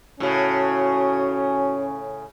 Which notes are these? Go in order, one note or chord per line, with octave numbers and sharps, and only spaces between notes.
A2 C#3 C#4 F#4